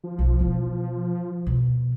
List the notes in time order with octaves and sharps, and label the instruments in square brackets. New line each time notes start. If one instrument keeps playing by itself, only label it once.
[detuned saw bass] F3
[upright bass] B1 B3
B2 E3
E2 B2